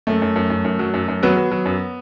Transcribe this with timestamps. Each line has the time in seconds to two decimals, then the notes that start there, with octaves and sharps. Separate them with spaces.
0.07 F#2 A3
0.22 F#2
0.36 F#2
0.50 F#2
0.64 F#2
0.79 F#3
0.94 F#2
1.08 F#2
1.23 F#3 B3
1.37 F#3
1.51 F#3
1.66 F#2